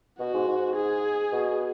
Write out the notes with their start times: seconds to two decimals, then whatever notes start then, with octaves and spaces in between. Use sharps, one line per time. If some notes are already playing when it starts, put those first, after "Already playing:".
0.19 B2 F#4
0.34 G#2
0.48 G#2
0.76 G#4
1.32 B2